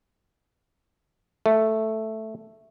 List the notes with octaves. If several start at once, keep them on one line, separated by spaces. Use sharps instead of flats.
A3